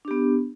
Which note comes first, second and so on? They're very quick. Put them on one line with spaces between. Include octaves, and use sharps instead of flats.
D4 G4 B3